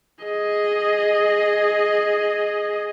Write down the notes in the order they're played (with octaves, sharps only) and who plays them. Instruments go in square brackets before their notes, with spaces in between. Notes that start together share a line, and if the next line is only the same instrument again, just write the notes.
[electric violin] G#4 D#5